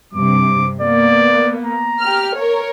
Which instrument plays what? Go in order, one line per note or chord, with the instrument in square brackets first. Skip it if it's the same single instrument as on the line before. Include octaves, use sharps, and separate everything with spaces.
[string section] G2 C3 [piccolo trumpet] D6
[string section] A#3 B3 [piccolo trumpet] D5
[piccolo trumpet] A#5
[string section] G4 F6
A#4 C#5